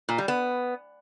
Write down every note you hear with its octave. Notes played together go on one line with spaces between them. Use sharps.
A#2
G3
B3